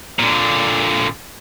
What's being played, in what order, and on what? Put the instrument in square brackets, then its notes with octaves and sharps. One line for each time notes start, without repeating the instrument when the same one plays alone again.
[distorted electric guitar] A#2 D3